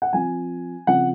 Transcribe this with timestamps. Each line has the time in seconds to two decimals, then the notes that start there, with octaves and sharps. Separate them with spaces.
0.02 F#5
0.13 F3 C4 G#5
0.87 C#3 F3 C4 F#5